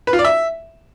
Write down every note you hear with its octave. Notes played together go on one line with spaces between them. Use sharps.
B4
F4
D5
E5